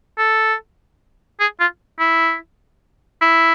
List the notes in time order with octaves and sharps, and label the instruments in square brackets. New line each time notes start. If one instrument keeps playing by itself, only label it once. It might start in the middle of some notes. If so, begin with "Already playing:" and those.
[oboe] A4
G#4
F4
E4
E4